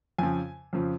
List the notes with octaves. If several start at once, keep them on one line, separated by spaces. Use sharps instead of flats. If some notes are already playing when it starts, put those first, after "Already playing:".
F2 C#3 F3 G#5
F2 C#3 F3